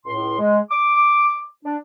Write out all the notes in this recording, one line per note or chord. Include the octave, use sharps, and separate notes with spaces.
C#2 A2 C6
G#3
D6
D4